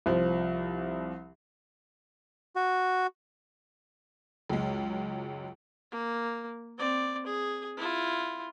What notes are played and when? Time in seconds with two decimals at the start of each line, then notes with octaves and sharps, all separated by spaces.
0.06 C2 F3
2.56 F#4
4.50 C#2 F#2 G#3
5.92 A#3
6.78 C4 D5
7.26 G#4
7.77 E4 F4